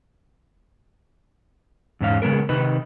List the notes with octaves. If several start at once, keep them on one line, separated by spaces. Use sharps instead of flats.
E2 G#2 C#4 F5
C#3 E3 G#3 B3 A#4
C3 D#3 D#4 B4